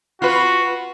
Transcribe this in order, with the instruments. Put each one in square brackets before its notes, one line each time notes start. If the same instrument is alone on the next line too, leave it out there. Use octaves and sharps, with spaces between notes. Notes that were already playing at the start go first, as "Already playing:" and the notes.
[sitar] F4 B4 [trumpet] F#4